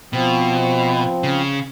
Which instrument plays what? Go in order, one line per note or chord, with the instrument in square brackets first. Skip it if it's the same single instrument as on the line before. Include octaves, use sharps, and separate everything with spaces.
[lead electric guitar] B2 [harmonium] F3 C4
[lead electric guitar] C#3